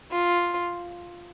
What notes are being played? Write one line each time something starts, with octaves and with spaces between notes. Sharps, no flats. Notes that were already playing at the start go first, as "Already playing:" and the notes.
F4